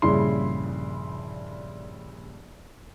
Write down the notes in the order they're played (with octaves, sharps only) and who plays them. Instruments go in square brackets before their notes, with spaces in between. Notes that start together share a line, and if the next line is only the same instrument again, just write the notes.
[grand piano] A#1 G2 C#3 E4 C6